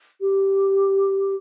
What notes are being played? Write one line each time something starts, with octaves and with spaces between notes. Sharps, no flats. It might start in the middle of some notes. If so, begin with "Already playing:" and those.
G4